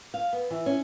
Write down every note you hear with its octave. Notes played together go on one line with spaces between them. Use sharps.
F5
B3
E3
C#4